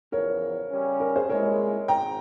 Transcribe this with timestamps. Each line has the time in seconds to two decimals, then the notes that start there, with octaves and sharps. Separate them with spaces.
0.12 E2 C#3 F3 A#4 C#5
0.71 C#3 G3 C#4
1.00 A#4
1.16 G#4 C5
1.30 C2 A#2 G#3 E4 A#4 C#5
1.88 G#1 G#2 G5 A#5